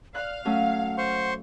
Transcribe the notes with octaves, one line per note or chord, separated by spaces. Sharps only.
D5 F5 F#6
F#3 A3 C#4 F#5
C5 C6 C#6